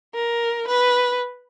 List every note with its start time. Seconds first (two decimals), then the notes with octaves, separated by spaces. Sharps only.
0.15 A#4
0.67 B4